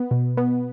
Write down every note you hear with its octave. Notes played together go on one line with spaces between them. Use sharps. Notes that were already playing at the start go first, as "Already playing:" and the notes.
Already playing: B3
B2
B3